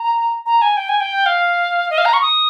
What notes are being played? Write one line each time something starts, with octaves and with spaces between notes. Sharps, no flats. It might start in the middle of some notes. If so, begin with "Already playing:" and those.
Already playing: A#5
A#5
G#5
G5
G#5
G5
F5
D#5
F5
A#5
C#6
D#6